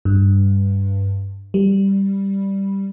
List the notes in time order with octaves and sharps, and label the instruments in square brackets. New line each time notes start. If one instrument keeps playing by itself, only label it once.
[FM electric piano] G2
G3